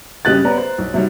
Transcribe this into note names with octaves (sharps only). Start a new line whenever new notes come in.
G2 C#3 G4 D#5 F#6 A6
B3 B4 D5 A#5
C5
B1
C3 F#3 G3 D#4